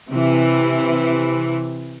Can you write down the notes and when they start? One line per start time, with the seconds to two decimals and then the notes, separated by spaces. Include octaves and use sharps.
0.12 C3 E3